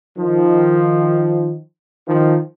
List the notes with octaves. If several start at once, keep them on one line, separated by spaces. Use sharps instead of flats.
D#3 F3
D#3 F3